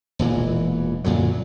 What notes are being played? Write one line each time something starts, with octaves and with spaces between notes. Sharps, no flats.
E1 A#2 E3
F#2 A#2 D3 F#3